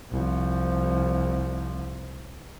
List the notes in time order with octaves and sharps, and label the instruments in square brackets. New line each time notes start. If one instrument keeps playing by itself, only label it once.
[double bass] C2 F3